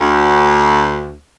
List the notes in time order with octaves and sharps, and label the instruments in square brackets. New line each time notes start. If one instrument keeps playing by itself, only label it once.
[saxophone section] D2